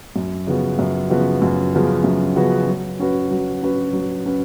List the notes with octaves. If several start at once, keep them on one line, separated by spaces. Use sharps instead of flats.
F#2
C#3 F3 B3 F#4
F#2
C#3 F3 B3 F#4
F#2
C#3 F3 B3 F#4
F#2
C#3 F3 B3 F#4
F#3
C#4 F#4 B4
F#3
C#4 F#4 B4
F#3
C#4 F#4 B4